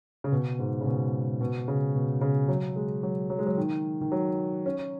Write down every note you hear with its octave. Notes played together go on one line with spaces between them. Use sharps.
C#3
B2
G#2
C#3
B2
B2
C#3
B2
C#3
F#3
G#3
F#3
F#3
G#3
F#3
D#3
D#3
F#3
C#4